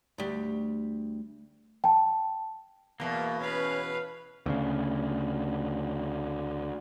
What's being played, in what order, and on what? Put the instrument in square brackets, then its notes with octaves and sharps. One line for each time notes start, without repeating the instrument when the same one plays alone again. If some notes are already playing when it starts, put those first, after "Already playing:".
[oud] D2 G3
[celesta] G5 A5
[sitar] E2 B2 [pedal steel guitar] A#3
[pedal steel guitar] C#4 [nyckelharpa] B4 F5
[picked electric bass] D2 C#3